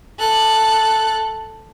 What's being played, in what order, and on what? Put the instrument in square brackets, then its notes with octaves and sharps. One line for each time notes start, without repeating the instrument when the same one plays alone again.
[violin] A4 F#6